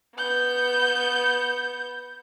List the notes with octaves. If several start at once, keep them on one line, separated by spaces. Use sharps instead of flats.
B3 G6